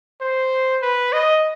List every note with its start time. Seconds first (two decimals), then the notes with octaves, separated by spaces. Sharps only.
0.21 C5
0.82 B4
1.13 D#5